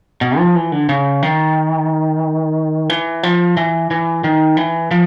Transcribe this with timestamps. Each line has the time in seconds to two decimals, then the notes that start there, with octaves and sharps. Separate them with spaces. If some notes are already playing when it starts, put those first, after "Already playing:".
0.21 B2
0.38 F3
0.55 E3
0.72 D3
0.89 C#3
1.23 D#3
2.89 E3
3.23 F3
3.57 E3
3.91 E3
4.24 D#3
4.57 E3
4.91 F3